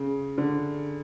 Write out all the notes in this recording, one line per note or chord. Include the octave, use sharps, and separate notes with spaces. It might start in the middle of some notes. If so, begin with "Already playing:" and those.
Already playing: C#3
D3